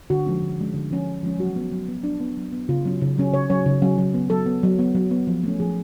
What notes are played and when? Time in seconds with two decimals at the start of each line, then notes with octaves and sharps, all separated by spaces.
0.10 D3 F#4
0.27 F3 G#3 C#4
0.42 D3
0.59 F3 G#3 C#4
0.74 D3
0.91 F3 G#3 C#4
1.06 D3
1.23 F3 G#3 C#4
1.39 F#3 F#4
1.56 B3
1.72 F#3
1.88 B3
2.04 F#3 D4
2.20 B3
2.37 F#3
2.53 B3
2.69 C#3 F4
2.85 F#3 C#4
3.02 C#3
3.17 F#3 C#4
3.33 C#3 C#5
3.50 F#3 C#4 C#5
3.66 C#3
3.82 F#3 C#4
3.98 F#3
4.14 B3
4.30 F#3 A4
4.46 B3
4.63 F#3
4.79 B3
4.95 F#3
5.11 B3
5.27 F3
5.43 A3 C#4
5.60 F3 G#4